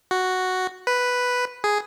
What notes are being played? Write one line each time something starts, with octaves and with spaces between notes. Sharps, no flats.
F#4
B4
G#4